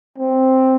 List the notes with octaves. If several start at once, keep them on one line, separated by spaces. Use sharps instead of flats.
C4